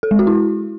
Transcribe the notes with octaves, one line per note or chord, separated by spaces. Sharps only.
A4
G#3
F#4
E4